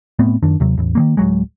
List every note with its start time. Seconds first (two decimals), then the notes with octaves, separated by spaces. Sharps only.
0.19 A2 A3 B3 C4
0.43 F#2 D#3 D4
0.60 D#2 C3 F#3
0.78 A1 E2
0.95 D#3 F3 A#3
1.17 D1 A#1 F#3 G#3